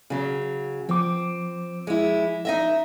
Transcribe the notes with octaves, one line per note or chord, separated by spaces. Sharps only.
C#3 F#3
F3 C4 D6
G#3 E4
D#4 D#5 E5